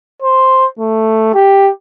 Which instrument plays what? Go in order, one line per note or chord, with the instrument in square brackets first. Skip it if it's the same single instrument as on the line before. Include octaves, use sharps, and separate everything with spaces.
[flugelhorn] C5
A3
G4